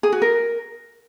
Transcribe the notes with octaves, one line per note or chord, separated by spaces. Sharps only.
G#4
F#4
A#4